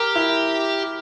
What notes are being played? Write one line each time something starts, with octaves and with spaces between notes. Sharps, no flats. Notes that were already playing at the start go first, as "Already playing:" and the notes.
Already playing: G4 A#4
E4